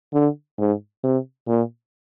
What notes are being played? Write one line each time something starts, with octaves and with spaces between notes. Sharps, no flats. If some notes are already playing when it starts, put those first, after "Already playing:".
D3
G#2
C3
A#2